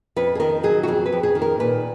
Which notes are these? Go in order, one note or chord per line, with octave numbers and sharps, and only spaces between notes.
F2 B4
G#4
D#3 A#4
F#3 G#4
F#4
F2 G#4
B4
F2
G#4
D#3
A#4
A#2 B4